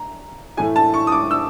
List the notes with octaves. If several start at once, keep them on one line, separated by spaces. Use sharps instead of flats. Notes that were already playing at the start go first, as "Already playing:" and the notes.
Already playing: A#5
A2 E3 A3 G#5
A5
C#6
D#6
D6
E6